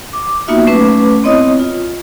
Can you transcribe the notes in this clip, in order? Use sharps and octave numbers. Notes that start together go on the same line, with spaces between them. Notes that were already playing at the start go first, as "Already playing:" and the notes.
D6
A#3 B3 D#4 F4 F#4 E5
F#3 A3 C#4 B4 D6
B3 C4 E4 C#5 D#5 D#6
F4